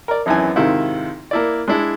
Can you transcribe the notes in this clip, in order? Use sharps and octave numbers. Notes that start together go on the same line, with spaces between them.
A#4 D5
G#1 F#2 E3 G#5
G#2 C3 D#3 E4 F4
A#3 E4 D5
G#3 D4 E4